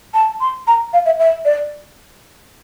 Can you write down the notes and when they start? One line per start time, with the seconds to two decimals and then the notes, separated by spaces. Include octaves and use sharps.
0.14 A5
0.40 C6
0.67 A#5
0.93 F5
1.05 E5
1.19 E5
1.45 D5